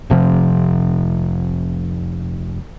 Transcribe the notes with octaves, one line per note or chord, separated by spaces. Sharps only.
F1 C3 F3